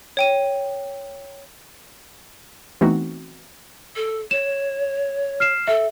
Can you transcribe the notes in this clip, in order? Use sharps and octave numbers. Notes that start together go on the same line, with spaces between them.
C#5 G5 D#7
E3 A3 B3 C4 D#4 F#4
A4
C#5 E7
F6 C7 E7
A4 E5